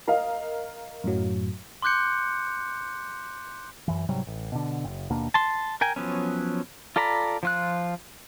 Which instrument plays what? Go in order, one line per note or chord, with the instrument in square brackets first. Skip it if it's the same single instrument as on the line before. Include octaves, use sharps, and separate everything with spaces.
[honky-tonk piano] A#4 D#5 F5
[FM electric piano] F#2 A2 F#3
[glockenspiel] C6 D6 F#6 G6 C#7
[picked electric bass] F#2 E3
G#2 C3 F#3 G3
A1
B2 D3
F#1
D#2 B2 A#3 D4
[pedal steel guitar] A5 C6
A#4 G5 G#5
F3 F#3 B3 C#4
F4 A4 D5 A#5 B5
F3 F4 F#6